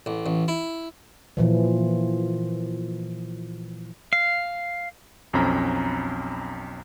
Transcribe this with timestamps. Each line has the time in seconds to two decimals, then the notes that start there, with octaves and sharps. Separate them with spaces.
0.06 A1
0.26 A1
0.48 E4
1.37 A#2 E3 F3
4.13 F5
5.33 B1 F2 C4 C#4 A#5 B5